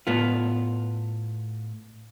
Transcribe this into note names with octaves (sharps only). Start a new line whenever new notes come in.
A2 B3 F4